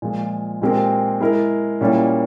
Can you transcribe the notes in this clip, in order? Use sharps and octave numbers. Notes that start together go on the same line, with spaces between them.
A#2 F3 G#3
A#2 G#3 C4 G4 A#4
G#3 E4 A#4
A#2 G3 A#3 C#4 E4